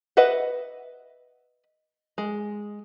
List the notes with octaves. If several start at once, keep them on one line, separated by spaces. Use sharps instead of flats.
B4 D#5 E5 F#5
G#3